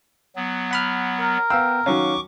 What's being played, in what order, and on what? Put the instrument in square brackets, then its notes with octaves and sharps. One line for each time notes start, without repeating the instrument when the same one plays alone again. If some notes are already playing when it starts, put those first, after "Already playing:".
[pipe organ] F#3 B3
[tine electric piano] F#5 B5 F6
[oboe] A#4
[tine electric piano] B3 G5 [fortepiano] F5 E6
[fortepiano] D#3 F#3 C#4 [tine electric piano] F5 [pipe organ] C#6 D6